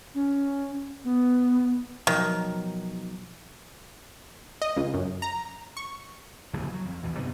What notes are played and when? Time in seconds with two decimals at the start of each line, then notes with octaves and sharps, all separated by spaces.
0.15 C#4
1.04 B3
2.07 B2 D#3 F3 F#3
4.62 D#5
4.77 C#2
4.94 F#2
5.22 A#5
5.77 C#6
6.53 D1 A#1 G2 C#3
6.74 F#3
6.85 F2
7.03 A#1 E2 B2 E3
7.19 G2 C3 D#3 B3